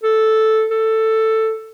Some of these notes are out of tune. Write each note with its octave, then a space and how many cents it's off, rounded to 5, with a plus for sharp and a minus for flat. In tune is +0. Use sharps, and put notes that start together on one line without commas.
A4 -5
A4 +10